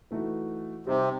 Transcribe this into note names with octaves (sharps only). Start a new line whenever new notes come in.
E3 A3 D#4 F#4
C3 G3 C4 D#4